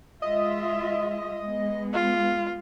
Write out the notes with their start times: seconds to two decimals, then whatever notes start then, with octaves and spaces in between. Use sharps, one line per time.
0.22 G#3 F4 D#5 E5
1.39 G#3 B3
1.94 F4